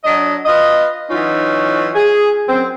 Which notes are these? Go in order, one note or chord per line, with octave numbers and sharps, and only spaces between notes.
F#3 D4 D#5
F4 B4 D#5
E3 F#3 C#4 D#4 F4
G#4
F#2 C4